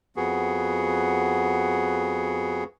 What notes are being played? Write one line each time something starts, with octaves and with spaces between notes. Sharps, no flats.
F2 B3 F#4 G#4